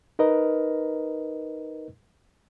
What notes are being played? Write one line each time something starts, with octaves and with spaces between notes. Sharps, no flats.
D#4 A#4 B4 D#5